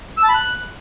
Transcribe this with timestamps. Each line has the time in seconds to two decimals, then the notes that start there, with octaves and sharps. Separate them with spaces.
0.17 E6
0.23 A5
0.29 B5
0.35 F#6